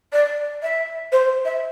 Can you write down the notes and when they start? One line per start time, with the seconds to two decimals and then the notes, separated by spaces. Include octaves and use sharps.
0.12 D5
0.62 E5
1.12 C5
1.45 E5